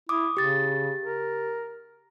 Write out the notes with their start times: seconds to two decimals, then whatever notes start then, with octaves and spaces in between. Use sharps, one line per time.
0.09 E4 D6 D#6
0.37 C#3 G4 A6
1.03 A#4